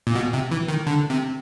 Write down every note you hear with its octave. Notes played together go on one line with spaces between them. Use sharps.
A#2
B2
C3
E3
D#3
D3
C3